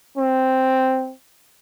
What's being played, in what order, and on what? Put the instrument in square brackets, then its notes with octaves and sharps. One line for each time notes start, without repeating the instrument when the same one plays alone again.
[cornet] C4